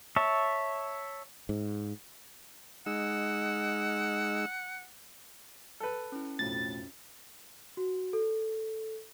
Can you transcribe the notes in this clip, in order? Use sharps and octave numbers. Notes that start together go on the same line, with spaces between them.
C#5 E5 A5
G#2
G#3 D#4 F#5 E6
A4 B4
C#4 E4
B1 F2 A2 A6
F#4
A4